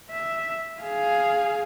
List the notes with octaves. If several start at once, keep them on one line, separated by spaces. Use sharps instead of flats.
E5
G#4 F5